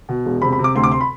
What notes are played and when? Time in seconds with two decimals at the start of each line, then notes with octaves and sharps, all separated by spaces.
0.09 B2
0.26 E1
0.42 C3 B5
0.52 B5
0.59 C3
0.64 D6
0.75 D2 C6
0.84 D6
0.92 C6
1.01 B5